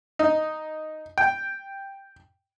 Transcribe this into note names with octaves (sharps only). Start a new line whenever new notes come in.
D#4
G5